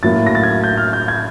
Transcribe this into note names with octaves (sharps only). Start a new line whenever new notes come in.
A2 F#3 A#3 A6
A#6
A6
G#6
G6
F6
G6
G#6